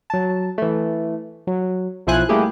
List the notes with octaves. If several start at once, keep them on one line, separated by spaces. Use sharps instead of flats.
F#3 A5
E3 A3
F#3
B1 F3 E4 C5 G#5 F#6
G3 A3 A#3 E4 G4 G#4